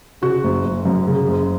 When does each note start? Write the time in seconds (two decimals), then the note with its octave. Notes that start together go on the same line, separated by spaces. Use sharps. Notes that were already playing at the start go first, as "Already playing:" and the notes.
0.22 C#3 F#4
0.44 F#1
0.65 F#1
0.85 F#2
1.07 C#3
1.28 F#1